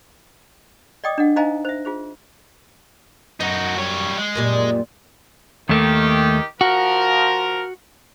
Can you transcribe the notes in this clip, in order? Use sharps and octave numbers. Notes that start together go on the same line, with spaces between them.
D5 D#5 G5 D6 D#6
D4 D#5 F#5
D#4 C5 D#5 F5 G#5 A#5
C5 E5
F4 G#4 C5
F#2 D#4 F#4
G3 C#5
G#3
F#2 A#2 G3
D#2 D#3 A3 G4
F3 F#4 A#4